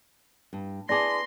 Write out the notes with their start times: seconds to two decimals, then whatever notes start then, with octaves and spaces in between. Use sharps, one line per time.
0.53 G2
0.89 B3 E4 G#4 D5 A5 C6 D6 A#6